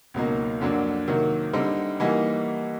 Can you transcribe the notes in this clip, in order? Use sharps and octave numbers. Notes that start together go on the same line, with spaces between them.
C#2 B2 F#3 A#3 D#4
F2 D3 F#3 A#3 D4
C3 D#3 F#3 A#3
D3 G3 C4 D#4
E3 G3 A#3 D#4 F#4